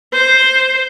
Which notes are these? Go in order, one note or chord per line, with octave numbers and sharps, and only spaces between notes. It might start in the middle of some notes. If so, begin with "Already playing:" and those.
C5